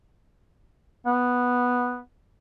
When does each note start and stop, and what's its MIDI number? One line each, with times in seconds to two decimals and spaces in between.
1.06 2.00 59